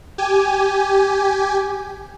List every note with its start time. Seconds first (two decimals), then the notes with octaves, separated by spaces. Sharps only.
0.18 G4 G#5